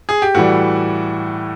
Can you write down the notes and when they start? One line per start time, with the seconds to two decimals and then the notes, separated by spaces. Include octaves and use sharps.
0.09 G#4
0.22 G4
0.35 A2 E3 G3 F#4